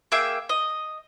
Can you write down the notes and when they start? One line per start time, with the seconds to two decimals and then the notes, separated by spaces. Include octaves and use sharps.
0.12 A#3 G#4 E5 G5
0.49 D#5